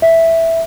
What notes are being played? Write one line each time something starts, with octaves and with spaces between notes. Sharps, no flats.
E5